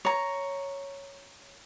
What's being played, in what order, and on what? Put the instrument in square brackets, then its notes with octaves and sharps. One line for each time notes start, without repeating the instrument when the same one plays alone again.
[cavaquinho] C#5 A#5